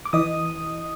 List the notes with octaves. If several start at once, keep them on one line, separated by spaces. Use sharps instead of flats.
D6
E3 D#5 D#6